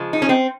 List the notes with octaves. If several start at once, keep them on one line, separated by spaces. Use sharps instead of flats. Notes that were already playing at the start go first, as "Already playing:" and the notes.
Already playing: C#3 F3 G#3
D#4
C#4
C4